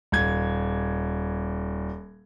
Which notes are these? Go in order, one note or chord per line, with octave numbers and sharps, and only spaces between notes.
D#1 G#6